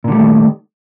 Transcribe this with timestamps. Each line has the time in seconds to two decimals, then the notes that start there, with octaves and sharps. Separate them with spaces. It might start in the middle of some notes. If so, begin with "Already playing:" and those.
0.04 A#2
0.08 D3
0.11 G3
0.15 A3
0.18 D#3